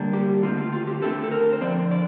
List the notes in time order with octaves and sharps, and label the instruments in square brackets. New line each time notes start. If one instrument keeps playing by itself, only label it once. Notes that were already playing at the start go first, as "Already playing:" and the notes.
Already playing: [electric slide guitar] D3 G3 A#3 D4
G4
D3 A3 C4 F4
F4
F4
G4
D3 A3 C4 A4
A4
A#4
C5
D3 F3 C4 D5
D5